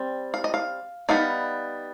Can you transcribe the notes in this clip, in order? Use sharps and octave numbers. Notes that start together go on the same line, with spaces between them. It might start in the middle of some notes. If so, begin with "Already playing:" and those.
Already playing: G3 C4
F5
D#5
F5
G3 B3 D#4 F5